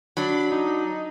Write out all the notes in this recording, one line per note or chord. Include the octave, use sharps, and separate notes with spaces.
F#3 D4 B5
D#4